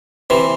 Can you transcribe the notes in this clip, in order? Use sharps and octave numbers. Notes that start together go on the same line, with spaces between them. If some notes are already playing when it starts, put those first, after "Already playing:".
C3 E3